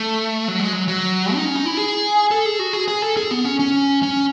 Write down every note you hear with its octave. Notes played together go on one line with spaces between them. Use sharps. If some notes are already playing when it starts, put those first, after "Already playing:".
Already playing: A3
F#3
G#3
F#3
F#3
D#4
C#4
D#4
E4
G#4
A4
G#4
F#4
G#4
G#4
A4
G#4
B3
C#4
C#4
C#4